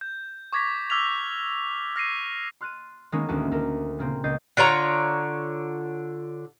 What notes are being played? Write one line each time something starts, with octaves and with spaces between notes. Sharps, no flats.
G6
C#6 D6 G#6 A#6 B6
D6 E6 F6 G#6 B6 F7
F6 A#6 C7 D#7
C6 F6 F#6 A6 D#7
D#3 G#3 A#3 B3 C#4 D#4
D#1 D2 D#3 G#3 F#4 A5
D2 A4 A#4
A#2 C#3 A#3 C4
C#2 D#5 G6 A6 C7
D3 F4 C#5 A#5